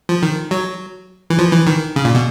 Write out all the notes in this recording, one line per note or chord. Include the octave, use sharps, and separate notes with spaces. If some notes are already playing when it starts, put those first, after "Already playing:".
F3
D#3
F#3
E3
F3
E3
D#3
C#3
A#2
B2